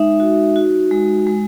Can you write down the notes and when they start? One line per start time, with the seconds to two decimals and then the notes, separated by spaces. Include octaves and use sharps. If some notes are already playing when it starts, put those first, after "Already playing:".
Already playing: G#3 D#4 E5
0.20 F#4
0.56 F#4
0.91 G#3
1.27 G#3